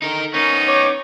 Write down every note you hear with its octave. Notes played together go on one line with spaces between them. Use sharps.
D3 D#4 A#4
B3 C#4 D#4 A#4 C#6
C#5 D6